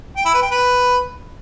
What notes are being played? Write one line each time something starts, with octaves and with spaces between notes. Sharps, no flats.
G5
E4
B4
G5
B4